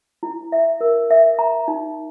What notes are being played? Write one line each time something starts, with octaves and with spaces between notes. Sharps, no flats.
E4
E5
A#4
E5
A#5
D#4